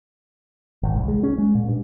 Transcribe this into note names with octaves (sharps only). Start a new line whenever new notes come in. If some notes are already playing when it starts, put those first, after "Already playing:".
G#1
C2
G#3
C#4
G#3
A#2
G2